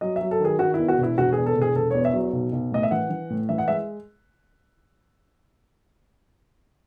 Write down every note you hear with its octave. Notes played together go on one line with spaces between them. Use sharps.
F#3 D#5
F#3 E5
A4
D#3 G#4
D#3 F#4
E2 E4
F#4
E1
E4
E1 F#4
E2 G#4
A4
E1
G#4
E1 A4
E2 C#5
E5
F#3
B1
B1
A2 D#5
E5
E3 F#5
E3
A2
E3 E5
F#5
G#3 E5